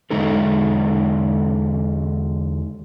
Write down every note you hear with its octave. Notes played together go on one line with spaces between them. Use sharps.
E2 D3 G#3 D#4 A4